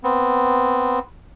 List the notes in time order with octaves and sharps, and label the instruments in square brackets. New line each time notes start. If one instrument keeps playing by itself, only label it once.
[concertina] B3 C4